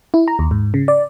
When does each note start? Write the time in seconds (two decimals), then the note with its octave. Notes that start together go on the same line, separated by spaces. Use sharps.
0.14 E4
0.28 A#5
0.39 D#2
0.51 G#2
0.74 C#3
0.88 D5